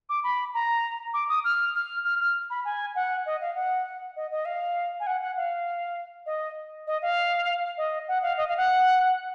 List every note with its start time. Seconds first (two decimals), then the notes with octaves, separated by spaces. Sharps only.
0.09 D6
0.24 B5
0.54 A#5
1.14 D6
1.29 D#6
1.44 F6
1.75 F6
2.04 F6
2.20 F6
2.50 B5
2.65 G#5
2.95 F#5
3.26 D#5
3.41 F5
3.55 F#5
4.16 D#5
4.31 D#5
4.45 F5
5.00 G#5
5.07 F#5
5.21 F#5
5.37 F5
6.26 D#5
6.87 D#5
7.02 F5
7.77 D#5
8.08 F#5
8.23 F5
8.37 D#5
8.48 F5
8.57 F#5